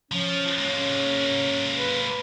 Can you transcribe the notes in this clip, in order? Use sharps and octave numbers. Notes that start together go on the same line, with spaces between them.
F3 C#4
G#3 A#3 C#4
B4